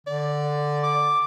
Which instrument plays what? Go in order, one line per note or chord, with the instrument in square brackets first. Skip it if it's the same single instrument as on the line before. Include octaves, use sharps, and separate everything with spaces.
[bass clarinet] D3 [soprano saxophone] D5
[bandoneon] D6